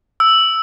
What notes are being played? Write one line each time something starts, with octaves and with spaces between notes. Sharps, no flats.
E6